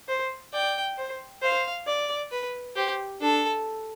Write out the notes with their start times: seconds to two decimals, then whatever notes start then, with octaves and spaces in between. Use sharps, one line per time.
0.08 C5
0.53 D5 G5
0.98 C5
1.42 C5 F5
1.87 D5
2.32 B4
2.76 G4 C5
3.20 D4 A4